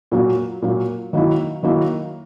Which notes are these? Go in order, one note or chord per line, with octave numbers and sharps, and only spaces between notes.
A#2 F#3 A#3
A#2 F#3 A#3
D#3 F#3 A#3 E4
D#3 F#3 A#3 E4